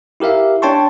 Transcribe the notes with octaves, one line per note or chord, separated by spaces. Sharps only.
E4 G4 A#4 E5 F5
D4 C#5 G5 A5 C6 C#6